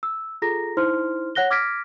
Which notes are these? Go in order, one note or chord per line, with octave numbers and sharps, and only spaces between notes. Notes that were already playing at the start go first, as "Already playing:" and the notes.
E6
F4 G#4 A4 A#5 A#6
D#4 E4 C5 C6 F6
C#5 F#5 F#6 A#6 G7
D6 F6 G#6 A#6 B6 D7